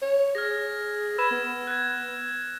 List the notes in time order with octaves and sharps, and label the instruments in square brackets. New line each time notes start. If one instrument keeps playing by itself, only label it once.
[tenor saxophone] C#5
[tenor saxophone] G#4 [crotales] F6 G#6 A#6
[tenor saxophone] B4 [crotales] E6 G#6 E7
[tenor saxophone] B3
[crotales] F#6 G#6